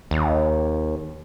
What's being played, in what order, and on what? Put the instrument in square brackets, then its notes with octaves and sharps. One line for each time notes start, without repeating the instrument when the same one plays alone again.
[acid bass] D#2